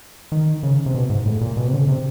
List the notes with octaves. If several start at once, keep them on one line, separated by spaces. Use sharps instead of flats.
D#3
C#3
C3
B2
G#2
A2
A#2
B2
C3
D3
C#3
C3